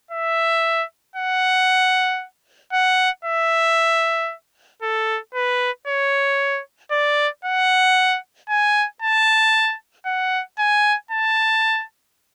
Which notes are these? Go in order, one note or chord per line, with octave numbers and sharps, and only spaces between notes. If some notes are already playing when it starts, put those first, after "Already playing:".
E5
F#5
F#5
E5
A4
B4
C#5
D5
F#5
G#5
A5
F#5
G#5
A5